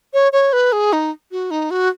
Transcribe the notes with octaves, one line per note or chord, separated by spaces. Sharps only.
C#5
C#5
B4
G#4
D#4
F#4
D#4
F#4